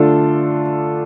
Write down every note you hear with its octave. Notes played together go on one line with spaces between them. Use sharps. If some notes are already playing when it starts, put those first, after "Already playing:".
Already playing: D3 A3 D4 F4 A4